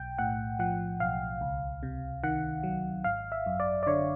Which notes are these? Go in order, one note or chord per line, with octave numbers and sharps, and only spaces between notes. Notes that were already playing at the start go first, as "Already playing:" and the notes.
Already playing: B1 G5
A2 F#5
F3 F#5
B1 F5
C#2
C3
D#3 F#5
F#3
G#1 F5
E5
F#2
D5
D5
D3 C#5